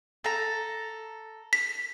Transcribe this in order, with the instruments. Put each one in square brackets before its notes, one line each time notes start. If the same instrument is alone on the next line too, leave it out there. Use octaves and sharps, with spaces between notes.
[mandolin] A4 A#5
[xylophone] B6